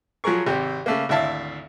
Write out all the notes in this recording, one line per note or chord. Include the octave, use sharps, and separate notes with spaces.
F3 F#3 G#4 A#4 C#6
G#1 C3 G4
C#3 A3 A#3
G#1 D2 E4 E5 F5 A5